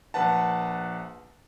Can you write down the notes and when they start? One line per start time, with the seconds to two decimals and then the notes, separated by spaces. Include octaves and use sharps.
0.14 A#1 B4 F#5 A5